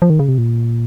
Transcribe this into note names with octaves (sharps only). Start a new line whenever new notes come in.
F3
D#3
C#3
C3
A#2